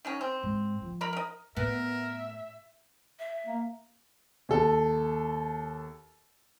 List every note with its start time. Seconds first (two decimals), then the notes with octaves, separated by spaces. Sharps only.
0.05 D#3 F#3 C#4
0.21 C4
0.43 G#2
0.82 F3
1.01 A#4 A#5 B5
1.13 A#4 D#5
1.57 A2 B3 A#4 E5
3.19 E5
3.46 A#3
4.49 D#2 A4